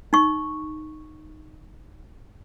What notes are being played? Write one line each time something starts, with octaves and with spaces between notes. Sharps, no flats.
D#4 C#6